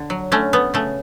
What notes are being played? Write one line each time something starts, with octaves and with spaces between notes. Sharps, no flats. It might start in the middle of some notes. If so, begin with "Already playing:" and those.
Already playing: D3
F#3
D3 A3 C#4
A3 B3
C#3 A3